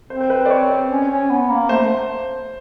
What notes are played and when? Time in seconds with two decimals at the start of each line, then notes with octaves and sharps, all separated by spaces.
0.10 C4 C5
0.21 C5
0.30 B4
0.39 C5
0.46 D5
0.50 C#5
0.90 C#4
1.10 C#4
1.30 B3
1.50 A#3
1.69 A3 C5